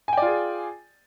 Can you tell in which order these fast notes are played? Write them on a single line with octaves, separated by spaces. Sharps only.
G#5 G5 D5 F4 G#4